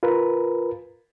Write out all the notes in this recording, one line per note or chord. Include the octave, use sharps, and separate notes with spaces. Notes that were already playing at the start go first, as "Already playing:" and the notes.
F4 A#4 B4